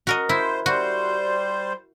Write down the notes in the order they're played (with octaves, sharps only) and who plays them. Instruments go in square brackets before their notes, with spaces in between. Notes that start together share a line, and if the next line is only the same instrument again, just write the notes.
[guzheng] F#4 A#4 D#5
[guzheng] E4 [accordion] C5
[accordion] G3 C5 [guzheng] F#4